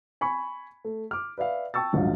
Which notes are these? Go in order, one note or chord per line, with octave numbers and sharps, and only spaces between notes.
G#5 B5 C#6
A3
D6 F6
B4 D5 E5 F5
G5 A5 C#6 E6 A6
D#1 A#1 G#2 F#3 F5